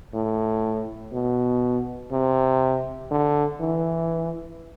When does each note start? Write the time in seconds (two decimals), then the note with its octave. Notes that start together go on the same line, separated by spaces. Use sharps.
0.14 A2
1.13 B2
2.12 C3
3.11 D3
3.61 E3